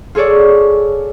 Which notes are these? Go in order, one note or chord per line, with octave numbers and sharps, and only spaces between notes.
F4 G#4 A4 C#5 D5